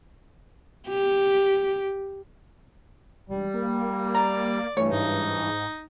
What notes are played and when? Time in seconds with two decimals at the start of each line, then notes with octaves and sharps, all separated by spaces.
0.89 G4
3.29 E1 G3
3.54 A#3
4.14 D5 A#5
4.77 G2 E3 A3 C#5
4.92 G#2 D#4